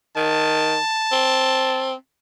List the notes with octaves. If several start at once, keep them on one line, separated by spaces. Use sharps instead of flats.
D#3 A5
C4